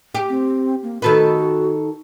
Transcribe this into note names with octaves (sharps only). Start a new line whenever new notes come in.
G4
C4
A#3
D#3 F#4 A4 B4